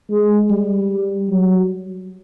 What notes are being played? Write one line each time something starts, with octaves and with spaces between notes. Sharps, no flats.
G#3
G3
F#3